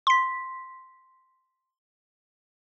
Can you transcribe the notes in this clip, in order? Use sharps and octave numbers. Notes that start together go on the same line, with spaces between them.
C6 B6